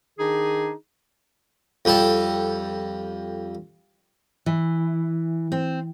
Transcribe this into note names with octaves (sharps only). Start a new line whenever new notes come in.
D#3 D4 D#4 G#4
F2 G3 A4
E3
C4